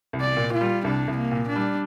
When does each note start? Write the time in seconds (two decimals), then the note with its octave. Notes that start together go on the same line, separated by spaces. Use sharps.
0.13 C2
0.21 D5
0.37 A#2
0.53 F4
0.61 G3
0.84 C2 D4
1.08 C2
1.17 A#3
1.32 A#2
1.48 D4
1.56 G3